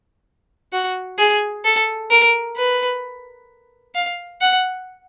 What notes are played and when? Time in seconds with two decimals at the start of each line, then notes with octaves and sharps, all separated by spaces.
0.73 F#4
1.19 G#4
1.65 A4
2.11 A#4
2.57 B4
3.95 F5
4.41 F#5